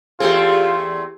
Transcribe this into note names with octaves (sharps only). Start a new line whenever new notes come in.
E2 A3 C4 F4 G4 G#4